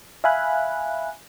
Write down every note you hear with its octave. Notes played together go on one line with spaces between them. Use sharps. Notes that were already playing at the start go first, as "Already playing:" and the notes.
E5 F5 G#5 B5 F#6